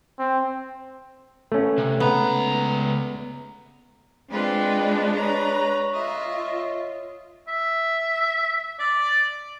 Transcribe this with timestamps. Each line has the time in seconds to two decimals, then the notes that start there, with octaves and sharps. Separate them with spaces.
0.19 C4
1.52 A3 C#4
1.78 C3
2.00 C#2 B3 A#5
4.31 G#3 C4 D4 F4 B4
5.16 B4 C#5 A#5
5.93 F4 D#5 E5
7.48 E5
8.80 D5